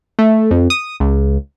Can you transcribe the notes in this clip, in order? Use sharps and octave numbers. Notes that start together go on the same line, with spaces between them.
A3
F2
D#6
C#2